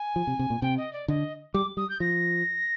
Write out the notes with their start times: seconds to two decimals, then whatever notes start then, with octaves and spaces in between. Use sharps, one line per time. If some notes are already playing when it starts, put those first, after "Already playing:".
Already playing: G#5
0.16 F3
0.27 C3
0.39 C3
0.50 A#2
0.62 C3 G5
0.77 D#5
0.93 D5
1.08 D3 D#5
1.54 G3 D6
1.77 G3 D#6
1.90 G6
2.00 F3 A#6